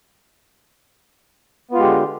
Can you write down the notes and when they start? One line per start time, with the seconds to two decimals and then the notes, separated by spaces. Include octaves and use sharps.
1.71 B3
1.74 F4
1.77 G#3
1.80 G4
1.83 D3